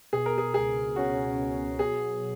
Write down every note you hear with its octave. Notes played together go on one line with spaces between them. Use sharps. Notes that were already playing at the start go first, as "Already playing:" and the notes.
B2 G#4
A#4
G#4
C#2 G#4
C#4 F#4
B2
F#3 G#4